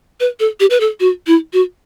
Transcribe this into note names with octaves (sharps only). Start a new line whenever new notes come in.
B4
A4
G4
B4
A4
F#4
E4
F#4